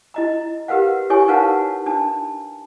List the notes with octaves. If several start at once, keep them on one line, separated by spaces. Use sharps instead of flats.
E4 D#5 A#5
G4 A#4 B4 F5 F#5
E4 G4 A4 C#5 G#5 C#6
D#4 A#4 B4 F5 F#5 A5
D4 A5